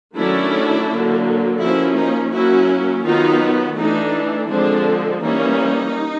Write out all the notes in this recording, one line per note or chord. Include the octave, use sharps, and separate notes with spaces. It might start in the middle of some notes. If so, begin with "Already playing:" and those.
D#3 F#3 A3 C#4 D4 E4
D3 F#3 A#3
F3 A#3 C#4 E4 F#4
D#4
F#3 A#3 C#4 E4 F#4
D#3 F#3 B3 D#4 F4
E3 A3 D4 D#4
D3 F3 G#3 C4 D4
E3 G3 A#3 C#4 D#4